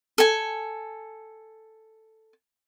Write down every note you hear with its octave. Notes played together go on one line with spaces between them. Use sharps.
A4 G#5